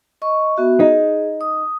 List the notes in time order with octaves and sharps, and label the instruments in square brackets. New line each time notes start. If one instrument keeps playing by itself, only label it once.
[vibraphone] D#5 C#6
B3 F#4 E5
[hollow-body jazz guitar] D#4 [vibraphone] G#4
[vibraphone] D#6